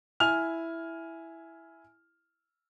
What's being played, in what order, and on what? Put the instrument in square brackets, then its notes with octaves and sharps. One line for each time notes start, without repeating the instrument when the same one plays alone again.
[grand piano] E4 G#5 F6 F7